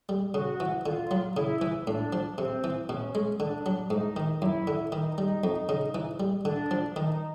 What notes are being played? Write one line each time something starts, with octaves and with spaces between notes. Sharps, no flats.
G3
C#3 F#4
E3
D3 F4
F#3
C#3 E4
E3
A2 D4
F3
C3 C4
E3
B2 C#4
G#3
D3 D4
F#3
G#2 D#4
D#3
F#2 E4
D3
D#3 D#4
G3
F2
C#3
E3
G3
D3 D4
F3
D#3 D#4